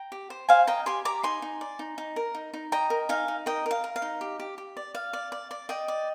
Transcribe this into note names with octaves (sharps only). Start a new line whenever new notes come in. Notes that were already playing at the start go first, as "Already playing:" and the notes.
Already playing: G5 A#5
G4
C5
C5 F5 G#5
D#5 G5 A#5
G4 G#5 C6
G4 A#5 D6
D#4 G#5 C6
D#4
D5
D#4
D#4
A#4
D#4
D#4
D#5 G5 A#5
A#4
D#4 F5 G#5
D#4
A#4 D#5 G5
A#4 F5
A#4
F5
D#4
G4
G4
G4
D5
D5 F5
D5
D5
D5
D5 D#5 G5
D5